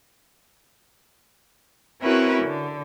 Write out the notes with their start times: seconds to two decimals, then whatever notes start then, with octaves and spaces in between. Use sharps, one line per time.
2.02 C4 C#4 E4 F#4 A#4 B4
2.43 D3